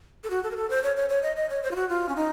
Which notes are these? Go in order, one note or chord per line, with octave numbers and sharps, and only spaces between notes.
A4
F#4
A4
A#4
A4
C5
C#5
C#5
C#5
D#5
D#5
C#5
C5
F4
F#4
F4
C#4
D#4